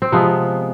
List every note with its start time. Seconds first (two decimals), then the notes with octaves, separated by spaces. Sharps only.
0.02 C4
0.12 C3 F3 G#3 B3